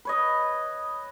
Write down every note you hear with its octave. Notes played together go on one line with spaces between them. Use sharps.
B4 C#5 D#5